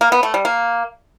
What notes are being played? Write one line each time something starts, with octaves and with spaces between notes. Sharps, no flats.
A#3
B3
A3
G3
A#3